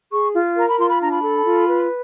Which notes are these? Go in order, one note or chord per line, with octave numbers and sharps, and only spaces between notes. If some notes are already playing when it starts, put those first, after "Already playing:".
G#4 C#6
F4
A#4 A#5
B5
F4 C6
B5
D4 A#5
B5
A4
F4
B4